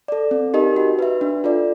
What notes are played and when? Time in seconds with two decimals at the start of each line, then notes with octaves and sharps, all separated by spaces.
0.08 A4 D5
0.31 C4
0.54 D#4 G4 A#4 D#5
0.76 F#4
0.99 B4 E5
1.21 D4
1.44 F4 A4 D5